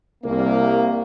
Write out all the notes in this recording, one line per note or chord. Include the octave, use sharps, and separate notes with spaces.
C2 A#3